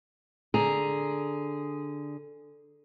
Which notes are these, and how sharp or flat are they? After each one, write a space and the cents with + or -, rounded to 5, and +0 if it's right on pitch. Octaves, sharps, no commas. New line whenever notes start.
D3 +0 G#4 +0 A#5 +0